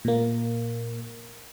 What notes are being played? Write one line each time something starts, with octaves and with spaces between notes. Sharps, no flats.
A#2 A#3